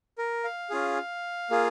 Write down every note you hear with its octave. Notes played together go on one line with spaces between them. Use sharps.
A#4
F5
C#4 F4 G#4
A#3 F4 G#4